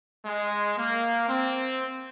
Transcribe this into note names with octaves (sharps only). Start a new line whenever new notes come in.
G#3
A#3
C4